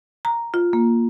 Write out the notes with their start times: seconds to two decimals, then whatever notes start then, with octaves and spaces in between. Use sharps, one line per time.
0.25 A#5
0.54 F4
0.73 A#3